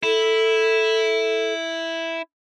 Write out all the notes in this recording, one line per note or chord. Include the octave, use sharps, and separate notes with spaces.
E4 A4